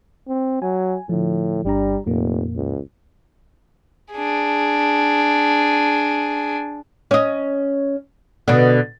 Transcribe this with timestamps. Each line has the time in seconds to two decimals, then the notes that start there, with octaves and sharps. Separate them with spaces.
0.28 C4
0.62 F#3 G#5
1.09 A2 D3 F3
1.65 G1 G3 D4 A#5
2.06 F1 F2 A#2 A#3
2.56 C#2
4.13 D4 G#4
7.11 C#4 D#5
8.48 B2 D3